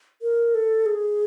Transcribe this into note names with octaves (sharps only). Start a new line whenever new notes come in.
A#4
A4
G#4